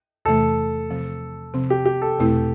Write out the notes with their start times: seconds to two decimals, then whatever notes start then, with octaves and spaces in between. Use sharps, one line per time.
0.25 E2 C3 E3 A3 A4
0.90 C3 F3 C4
1.54 C3 F3 C4
1.70 G4
1.85 G4
2.02 A4
2.19 E2 B2 A3 C4 E4